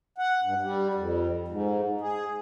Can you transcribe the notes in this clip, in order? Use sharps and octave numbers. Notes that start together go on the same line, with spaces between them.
F#5
G2
G3
F2
G#2
G#4